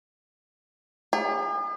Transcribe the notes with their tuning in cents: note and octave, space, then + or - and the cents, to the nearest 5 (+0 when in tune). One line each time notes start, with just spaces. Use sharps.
G#4 -45